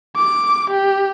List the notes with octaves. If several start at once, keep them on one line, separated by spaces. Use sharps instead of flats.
D6
G4